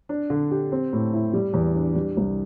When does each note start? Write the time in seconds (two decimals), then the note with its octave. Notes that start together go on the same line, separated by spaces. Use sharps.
0.09 D4
0.30 D3
0.51 G4
0.72 C4
0.93 A2
1.14 E4
1.33 G3
1.54 E2
1.76 D4
1.95 G3
2.17 C2